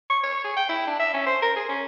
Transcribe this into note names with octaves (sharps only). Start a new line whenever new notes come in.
C#6
C#5
G#4
G5
E4
D4
E5
C#4
C5
A#4
G#4
C#4